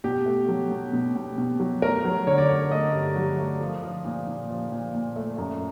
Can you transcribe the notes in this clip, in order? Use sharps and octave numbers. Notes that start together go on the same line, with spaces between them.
B2 G4
A3
F#3
B2
B2
B2
B2
F#3
A3 A#4
F#3
D3 C#5
D5
A3 C#5
A3 D#5
G2
F#3
A3
F3
F3
A#2
A#2
F3
A#2
A#2
A3
F#2